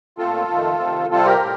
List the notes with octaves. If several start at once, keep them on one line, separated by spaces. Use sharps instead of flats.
A#2 A3 C4 F4 A4
F2 D#3 A3
C3 D#3 A3 C4
C3 G3 C4 F4 A4
G4 A#4
A2